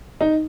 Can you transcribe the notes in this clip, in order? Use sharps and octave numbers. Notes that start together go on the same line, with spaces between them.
D#4